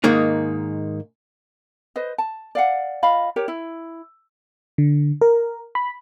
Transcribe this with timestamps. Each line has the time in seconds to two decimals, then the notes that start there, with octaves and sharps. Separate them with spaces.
0.04 G#2 D#3 G#3 A#3 D#4
1.96 B4 C5 D#5
2.18 A5
2.55 D5 F5 F#5
3.02 F4 D#5 F5 B5
3.36 G4 A#4 C#5
3.48 E4
4.78 D3
5.21 A#4
5.75 B5